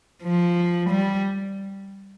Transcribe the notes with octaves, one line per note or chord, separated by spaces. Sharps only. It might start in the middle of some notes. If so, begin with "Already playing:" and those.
F3
G3